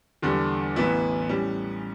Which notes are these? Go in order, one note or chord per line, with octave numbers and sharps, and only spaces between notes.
E2 D3 G3
A1 A2 E3 B3 E4
A2 G3 C#4